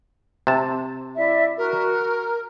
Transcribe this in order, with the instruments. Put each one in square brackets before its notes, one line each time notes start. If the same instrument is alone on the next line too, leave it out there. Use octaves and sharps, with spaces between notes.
[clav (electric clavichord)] C3 A5
[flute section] E4 D5 E5
[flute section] F#4 [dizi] A#4